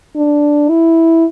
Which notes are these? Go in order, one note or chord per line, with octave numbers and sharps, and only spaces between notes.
D4
E4